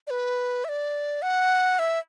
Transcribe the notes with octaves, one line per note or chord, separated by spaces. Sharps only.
D5
B4
E5
D5
F#5
E5